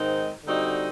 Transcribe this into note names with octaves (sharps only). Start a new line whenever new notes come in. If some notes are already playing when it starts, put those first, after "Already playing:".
Already playing: G#2 D#3 G#3 C4 D#4
D3 G3 C4 D#4 F#4